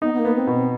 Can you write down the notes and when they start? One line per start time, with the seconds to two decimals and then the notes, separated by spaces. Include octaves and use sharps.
0.02 B3 D#4
0.14 B3
0.19 A#3
0.25 B3
0.36 C4
0.47 B2
0.53 C4